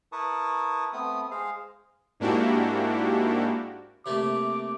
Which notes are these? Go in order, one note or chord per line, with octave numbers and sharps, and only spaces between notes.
E4 A#4 B4 A5 C#6 D#6
A3 B3 C4 D#6
G#3 G#4 C5 F5
G#2 A#3 D4 E4 F#4 G4
C3 A3 A#3 D6